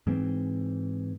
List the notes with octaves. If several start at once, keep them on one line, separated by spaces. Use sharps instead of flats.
G#2 E3 C4